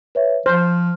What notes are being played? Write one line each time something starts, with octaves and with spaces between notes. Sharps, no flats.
B4 C#5 E5
F3 C5 F6